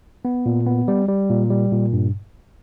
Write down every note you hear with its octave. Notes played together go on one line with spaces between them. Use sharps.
B3
A#2
B3
G3
G3
A#2
G3
A#2
G2